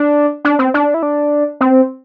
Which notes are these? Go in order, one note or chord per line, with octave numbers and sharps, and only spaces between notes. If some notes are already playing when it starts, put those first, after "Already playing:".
Already playing: D4
D4
C4
D4
E4
D4
C4